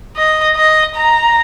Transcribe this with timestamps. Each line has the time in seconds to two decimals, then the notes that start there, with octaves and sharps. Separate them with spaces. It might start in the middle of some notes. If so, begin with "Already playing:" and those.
0.17 D#5
0.56 D#5
0.95 A#5